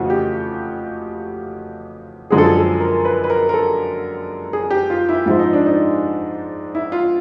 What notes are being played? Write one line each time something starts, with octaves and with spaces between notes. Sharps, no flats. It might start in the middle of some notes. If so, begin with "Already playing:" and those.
Already playing: F2 C#3 E3 A3 F4 F#4
G4
F#2 D3 F3 G#3 G#4
A4
G#4
A4
A#4
B4
B4
A#4
A#4
A4
G#4
G4
F4
E4
G#2 F3 G#3 E4
D#4
D4
D#4
E4
F4